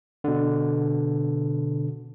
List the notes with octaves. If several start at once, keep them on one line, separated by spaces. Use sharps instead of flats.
B2 D3